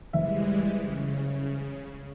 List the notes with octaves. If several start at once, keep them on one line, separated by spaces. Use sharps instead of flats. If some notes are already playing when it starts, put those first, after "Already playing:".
F#1 E3 G3 G#3 E5
C#3